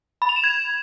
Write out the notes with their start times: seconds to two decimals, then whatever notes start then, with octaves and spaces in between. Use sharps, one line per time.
0.22 B5
0.29 F7
0.36 E7
0.44 G#6